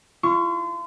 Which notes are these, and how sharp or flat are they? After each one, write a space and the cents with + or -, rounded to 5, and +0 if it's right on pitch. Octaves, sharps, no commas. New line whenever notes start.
F4 -35 C#6 +0